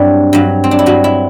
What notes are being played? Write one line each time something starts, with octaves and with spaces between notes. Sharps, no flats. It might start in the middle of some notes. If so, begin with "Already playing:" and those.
Already playing: G2 F#3 C4 D4 E4
G2 F#3
C4
D4
E4
G2 F#3 F#4
E4